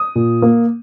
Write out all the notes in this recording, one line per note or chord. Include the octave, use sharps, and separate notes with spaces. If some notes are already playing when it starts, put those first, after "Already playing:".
Already playing: D#6
A#2
A#3